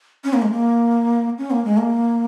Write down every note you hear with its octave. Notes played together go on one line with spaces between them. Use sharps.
C#4
A#3
G#3
A#3
C#4
A#3
G#3
A#3